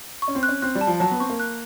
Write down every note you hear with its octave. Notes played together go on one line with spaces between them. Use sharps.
C#6
C#4
C4
F#6
C#4
C4 F#6
G3
A5
F3
F#3 A5
B3
C4 C#6
A#3
F#6